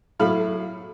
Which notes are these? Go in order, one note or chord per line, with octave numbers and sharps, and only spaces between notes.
A2 F#3 E4 F5 B5 F6